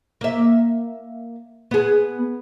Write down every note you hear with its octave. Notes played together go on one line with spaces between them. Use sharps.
A#3 E5
B3 G#4